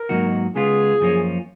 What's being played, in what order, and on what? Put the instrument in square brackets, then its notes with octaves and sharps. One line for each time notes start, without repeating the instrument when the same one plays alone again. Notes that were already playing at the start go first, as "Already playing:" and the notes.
Already playing: [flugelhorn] A#4
[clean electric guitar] G#2 F#3 A#3 D#4 F#4
[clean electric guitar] C#3 G#3 B3 F4 [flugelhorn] G#4
[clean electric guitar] F#2 F3 A#3 C#4